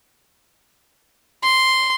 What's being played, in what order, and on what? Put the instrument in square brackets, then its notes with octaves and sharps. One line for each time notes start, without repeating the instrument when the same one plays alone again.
[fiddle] C6